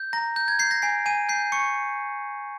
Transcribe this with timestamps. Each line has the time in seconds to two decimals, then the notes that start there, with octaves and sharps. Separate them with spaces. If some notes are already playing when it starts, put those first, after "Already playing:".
Already playing: G6
0.13 A#5 A#6
0.36 G6
0.48 G#6
0.59 G6 C7
0.71 A#6
0.82 G#5 C7
1.06 G#5 D#7
1.29 G6 C7
1.52 C#6 C#7